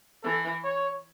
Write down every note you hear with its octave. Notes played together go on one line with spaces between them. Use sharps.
E3 A4
C#5